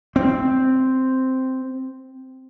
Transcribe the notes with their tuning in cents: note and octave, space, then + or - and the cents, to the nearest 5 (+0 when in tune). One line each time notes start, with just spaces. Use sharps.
C4 -5